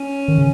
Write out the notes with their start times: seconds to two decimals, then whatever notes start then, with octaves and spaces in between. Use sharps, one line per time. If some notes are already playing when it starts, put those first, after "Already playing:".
Already playing: C#4
0.28 D#3
0.38 C#3